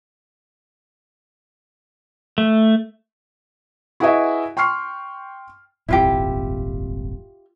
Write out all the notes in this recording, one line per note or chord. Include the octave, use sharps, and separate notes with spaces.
A3
E4 F#4 G#4 B4 D#5 E5
G5 C6 C#6 F6 C7
D#1 G#1 F2 E4 F4 G4